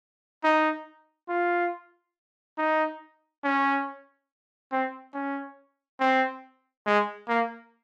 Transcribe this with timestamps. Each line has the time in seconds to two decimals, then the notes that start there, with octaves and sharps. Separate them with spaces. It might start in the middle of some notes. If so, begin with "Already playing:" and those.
0.44 D#4
1.29 F4
2.58 D#4
3.44 C#4
4.72 C4
5.14 C#4
6.00 C4
6.86 G#3
7.28 A#3